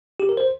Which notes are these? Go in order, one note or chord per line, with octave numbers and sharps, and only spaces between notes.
G4
A#4
C5